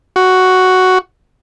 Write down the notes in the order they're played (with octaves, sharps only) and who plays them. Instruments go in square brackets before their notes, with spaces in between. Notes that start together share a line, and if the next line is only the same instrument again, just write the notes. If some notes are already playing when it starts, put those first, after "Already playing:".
[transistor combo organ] F#4